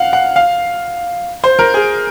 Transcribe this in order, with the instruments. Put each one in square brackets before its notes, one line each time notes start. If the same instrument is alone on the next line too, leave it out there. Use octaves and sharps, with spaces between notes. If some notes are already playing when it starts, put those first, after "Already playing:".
Already playing: [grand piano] F5 F#5
F#5
F5
C5
A#4
G#4